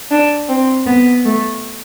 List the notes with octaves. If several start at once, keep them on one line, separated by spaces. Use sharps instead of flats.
D4
C4
B3
A3